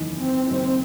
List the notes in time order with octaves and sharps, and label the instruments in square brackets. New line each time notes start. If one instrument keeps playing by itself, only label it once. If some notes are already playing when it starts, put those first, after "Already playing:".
Already playing: [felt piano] F#1 E2 D#3
[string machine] C4
[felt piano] F#1 F#2 D#3 [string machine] C4